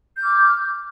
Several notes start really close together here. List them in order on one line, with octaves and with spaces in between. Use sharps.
G6 F6 D6